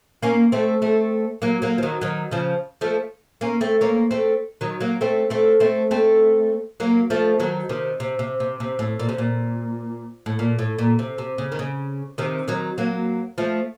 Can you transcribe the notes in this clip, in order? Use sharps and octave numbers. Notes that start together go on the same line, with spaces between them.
A#3 C#4
A3 C4
A3 C4
F#3 A#3
F#3 A#3
F3
D#3 F#3
D#3 F#3
C#3 F3
F3 A3
A#3 C#4
A3 C4
A#3 C#4
A3 C4
D#3 F#3
F#3 A#3
A3 C4
A3 C4
A3 C4
A3 C4
F#3 A#3
F3 A3
D#3 F#3
C3 D#3
C3
C3
C3
C3
A2
A#2
C3
A#2
A2
A#2
A2
A#2
C3
C3
C#3
D#3
C#3
C3 D#3
D#3 F#3
F#3 A#3
F3 A3